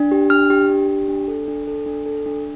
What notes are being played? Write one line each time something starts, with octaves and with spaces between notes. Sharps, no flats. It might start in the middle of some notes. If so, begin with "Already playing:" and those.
Already playing: D4
G4
D4 F6
G4
D4
G4
D4
A4
D4
A4
D4
A4
D4